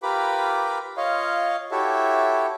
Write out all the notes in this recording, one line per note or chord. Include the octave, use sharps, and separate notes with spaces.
F4 G4 A#4 B4 B5 D6
F4 C#5 D#5 F5
E4 F#4 G4 A4 C#5 E5